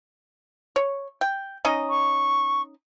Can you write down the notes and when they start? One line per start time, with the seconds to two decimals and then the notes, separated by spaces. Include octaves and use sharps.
0.76 C#5
1.21 G5
1.65 C#4 D#4 D#5
1.89 C#6